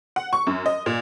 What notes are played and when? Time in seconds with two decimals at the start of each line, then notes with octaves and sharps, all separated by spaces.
0.16 F#5
0.33 C#6
0.47 F#2
0.66 D#5
0.86 A#2